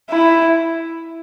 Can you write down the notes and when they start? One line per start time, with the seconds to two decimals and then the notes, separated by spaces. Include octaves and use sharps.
0.11 E4